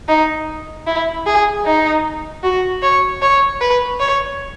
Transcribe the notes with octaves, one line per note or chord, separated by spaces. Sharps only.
D#4
E4
G#4
D#4
F#4
C#5
C#5
B4
C#5